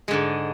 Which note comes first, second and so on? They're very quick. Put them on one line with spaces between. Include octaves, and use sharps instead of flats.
G#3 D3 G#2